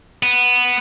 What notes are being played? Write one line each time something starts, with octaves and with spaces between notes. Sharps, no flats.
B3